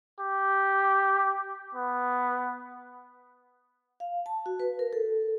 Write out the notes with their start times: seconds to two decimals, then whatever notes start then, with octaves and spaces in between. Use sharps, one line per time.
0.20 G4
1.75 B3
4.00 F5
4.26 A5
4.46 F#4
4.60 B4
4.79 A#4
4.93 A4